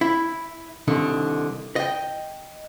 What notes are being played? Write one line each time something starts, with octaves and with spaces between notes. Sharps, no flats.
E4
C2 D3 D#3
D#5 G5